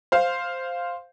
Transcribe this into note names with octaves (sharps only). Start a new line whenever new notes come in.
C5 F5